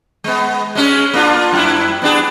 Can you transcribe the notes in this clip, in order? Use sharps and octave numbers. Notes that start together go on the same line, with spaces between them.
G#3 B3
G#3 C#4 G#4
A#3 D4 F4
F#2 E4
B3 D4 G#4